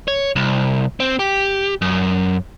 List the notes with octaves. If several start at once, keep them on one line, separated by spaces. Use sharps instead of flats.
C#5
C2
C4
G4
F#2